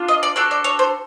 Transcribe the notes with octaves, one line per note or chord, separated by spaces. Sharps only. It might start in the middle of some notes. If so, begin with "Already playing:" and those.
Already playing: D4 F4
D#5
D5
D4 F#4 A4 D5
D5
C#5
C5